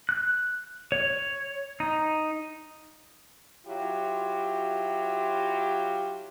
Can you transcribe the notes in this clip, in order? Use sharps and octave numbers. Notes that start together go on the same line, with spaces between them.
F#6
C#5
D#4
F#3 E4 F4 G4